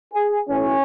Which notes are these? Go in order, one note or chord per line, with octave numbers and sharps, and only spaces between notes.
G#4
B1 A2 E3 C#4